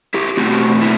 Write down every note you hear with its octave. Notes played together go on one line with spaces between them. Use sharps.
E4 G4
B2 A3 C4 F#4
E4